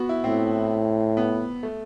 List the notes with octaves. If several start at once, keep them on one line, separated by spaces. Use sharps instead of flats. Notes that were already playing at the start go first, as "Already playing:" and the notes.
Already playing: B3 F#4
E4
A2 C4
B3
A3